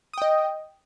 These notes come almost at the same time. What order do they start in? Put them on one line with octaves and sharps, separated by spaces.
D#6 G5 D#5